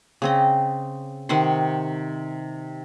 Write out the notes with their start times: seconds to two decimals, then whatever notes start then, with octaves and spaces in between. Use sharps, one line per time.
0.22 C#3 C4 D#5
1.29 C3 D#3 F#5 C6